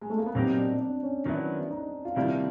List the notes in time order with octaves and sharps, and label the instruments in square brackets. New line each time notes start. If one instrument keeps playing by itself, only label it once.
[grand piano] G#3
A3
A#3
B3
[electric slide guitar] A#2 F#3 A#3 D#4 G4 [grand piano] C4
[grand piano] D4
D4
C#4
[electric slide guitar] D#3 F#3 B3 E4 [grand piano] D4
[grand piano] D#4
F4
[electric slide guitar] C3 D#3 G3 A#3 D4 [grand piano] E4